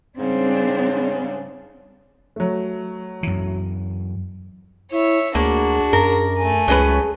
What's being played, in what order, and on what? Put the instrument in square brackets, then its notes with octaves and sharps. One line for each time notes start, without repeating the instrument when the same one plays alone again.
[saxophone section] G#2 C#3 [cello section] G3 C4 D4
[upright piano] F#3 A3
[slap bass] F#2 E3
[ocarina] E4 [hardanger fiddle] C#5 E5
[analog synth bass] D2 [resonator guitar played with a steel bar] A#3 [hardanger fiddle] D4 F#4 [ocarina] G#4
[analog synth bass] F#2 [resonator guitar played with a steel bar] A#4
[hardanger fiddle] A3 G#5
[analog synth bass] C#2 [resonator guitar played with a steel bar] F#3 C#4 B4 [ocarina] G#4